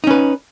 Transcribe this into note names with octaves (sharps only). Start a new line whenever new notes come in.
C#4 D#4 B4